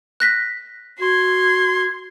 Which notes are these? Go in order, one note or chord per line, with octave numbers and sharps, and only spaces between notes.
F#6 A#6 B6
F#4 C6 G#6